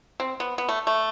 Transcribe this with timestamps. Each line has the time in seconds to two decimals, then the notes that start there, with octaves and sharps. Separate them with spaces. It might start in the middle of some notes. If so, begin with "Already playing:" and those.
0.20 C4
0.40 B3
0.58 B3
0.69 A3
0.87 A3